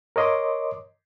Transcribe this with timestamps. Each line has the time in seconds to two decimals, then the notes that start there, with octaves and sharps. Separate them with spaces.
0.16 A#4 C#5 D#5 C6 D6